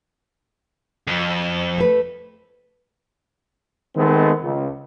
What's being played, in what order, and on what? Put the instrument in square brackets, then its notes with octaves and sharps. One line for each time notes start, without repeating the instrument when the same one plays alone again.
[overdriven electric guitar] F2
[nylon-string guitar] A3 B4
[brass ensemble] D#3 G#3 A3 B3 C4
C#2